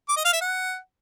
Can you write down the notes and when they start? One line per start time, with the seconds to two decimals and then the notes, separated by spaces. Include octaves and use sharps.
0.09 D6
0.17 D#5
0.25 F5
0.33 E5
0.41 F#5